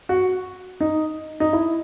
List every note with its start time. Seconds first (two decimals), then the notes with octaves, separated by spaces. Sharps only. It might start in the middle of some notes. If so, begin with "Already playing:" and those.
0.09 F#4
0.81 D#4
1.40 D#4
1.53 E4